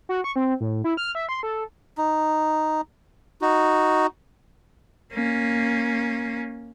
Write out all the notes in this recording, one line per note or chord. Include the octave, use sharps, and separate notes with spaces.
F#4
C#6
C4
A2
E4
F6
E5
C6
A4
D#4
D#4 F#4
A#3 C#4